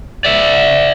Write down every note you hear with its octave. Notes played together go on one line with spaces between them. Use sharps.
D5 E5